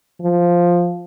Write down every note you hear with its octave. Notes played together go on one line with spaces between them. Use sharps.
F3